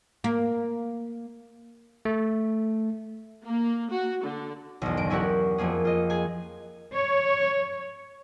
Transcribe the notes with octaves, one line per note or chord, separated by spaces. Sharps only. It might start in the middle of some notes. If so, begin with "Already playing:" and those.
A#3
A3
A#3
F#4
D3
B1 E2
G1 D7
C#4 E4 F#4 G4 A#4 F#5
F2 F3 A#3 G#4
F4 D#5
G#4 G#5
C#5